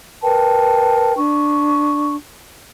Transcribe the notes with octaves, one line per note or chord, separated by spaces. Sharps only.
A#4 B4 G5 A5
D4 C#6